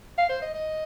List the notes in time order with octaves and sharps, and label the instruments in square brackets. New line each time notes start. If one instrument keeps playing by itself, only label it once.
[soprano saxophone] F5
C5
D#5
D#5